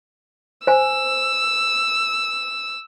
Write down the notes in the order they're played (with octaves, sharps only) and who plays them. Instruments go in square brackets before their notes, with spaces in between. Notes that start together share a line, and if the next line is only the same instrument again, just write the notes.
[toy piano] C5 G#5 [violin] E6